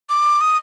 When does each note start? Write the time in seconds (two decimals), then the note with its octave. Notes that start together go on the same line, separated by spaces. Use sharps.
0.09 D6
0.41 D#6